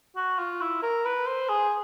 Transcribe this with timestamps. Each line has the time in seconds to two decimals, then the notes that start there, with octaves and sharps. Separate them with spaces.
0.16 F#4
0.39 F4
0.61 E4
0.83 A#4
1.06 B4
1.27 C5
1.49 G#4